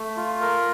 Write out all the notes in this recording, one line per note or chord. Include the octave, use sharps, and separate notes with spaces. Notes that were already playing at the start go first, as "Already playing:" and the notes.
Already playing: A3
F4
A#4